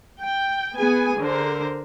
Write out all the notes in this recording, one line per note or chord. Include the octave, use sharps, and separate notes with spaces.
G5
B3 G#4 G#5
D3 A#4 C5